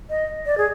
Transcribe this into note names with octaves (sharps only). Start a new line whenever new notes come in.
D#5
D5
G#4